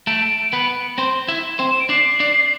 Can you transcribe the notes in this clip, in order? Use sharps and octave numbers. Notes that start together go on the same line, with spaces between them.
A3 A4 D7
B3 B4
C4 C5
E4 E5
C4 C5
E7
D7
D4 D5 C7
D4 D5